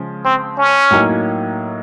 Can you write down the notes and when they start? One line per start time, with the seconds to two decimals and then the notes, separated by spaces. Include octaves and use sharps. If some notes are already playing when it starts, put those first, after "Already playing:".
Already playing: C#3 F3 G#3
0.25 C4
0.58 C#4
0.91 A2 F#3 A#3 D#4